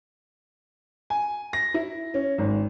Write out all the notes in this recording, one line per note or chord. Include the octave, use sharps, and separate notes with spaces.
G#5
A#6
E4
C#4
G#1